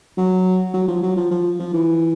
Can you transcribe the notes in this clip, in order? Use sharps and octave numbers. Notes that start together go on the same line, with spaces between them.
F#3
F#3
F3
F#3
F3
F3
F3
E3